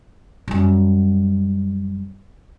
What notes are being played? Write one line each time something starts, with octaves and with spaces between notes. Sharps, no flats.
F#2 G3